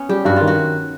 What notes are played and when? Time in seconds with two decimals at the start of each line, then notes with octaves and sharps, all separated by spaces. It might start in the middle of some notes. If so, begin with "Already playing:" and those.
Already playing: B3 C#4
0.09 G3 G4
0.25 G2 F#4
0.36 D#3 F4
0.47 F#4